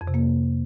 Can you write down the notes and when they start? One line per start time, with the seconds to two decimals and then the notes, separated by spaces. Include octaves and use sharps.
0.01 F2
0.08 C3
0.14 A#3